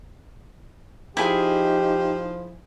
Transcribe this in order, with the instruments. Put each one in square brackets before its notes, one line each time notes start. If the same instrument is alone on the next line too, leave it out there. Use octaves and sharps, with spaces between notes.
[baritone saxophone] F3 [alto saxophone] D#4 [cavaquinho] E4 G#4 [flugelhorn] G4